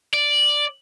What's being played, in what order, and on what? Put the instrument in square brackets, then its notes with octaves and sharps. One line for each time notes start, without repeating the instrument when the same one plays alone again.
[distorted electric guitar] D5